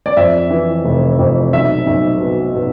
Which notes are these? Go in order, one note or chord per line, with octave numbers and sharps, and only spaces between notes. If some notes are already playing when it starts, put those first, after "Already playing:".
D5
F2 E5
E3
F1
F2
B1 E5
B1
B2
B2